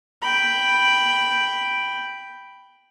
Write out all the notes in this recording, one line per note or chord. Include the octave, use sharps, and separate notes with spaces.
G5 B5